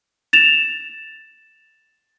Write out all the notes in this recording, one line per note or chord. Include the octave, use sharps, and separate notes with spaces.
A6 E7 F7